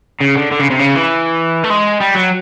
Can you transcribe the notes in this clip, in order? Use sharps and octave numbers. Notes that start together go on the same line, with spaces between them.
C#3
D3
D3
C#3
C3
C#3
E3
A3
G#3
G3
F#3